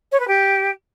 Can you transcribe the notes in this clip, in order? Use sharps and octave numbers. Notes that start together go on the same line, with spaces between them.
C#5
B4
G4